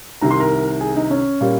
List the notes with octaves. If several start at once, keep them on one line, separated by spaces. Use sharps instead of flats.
C2 C3 D#3 A#5
C6
A#4 A#5
G#4 G#5
D#4 D#5
C#4 C#5
A#2 G3 A#3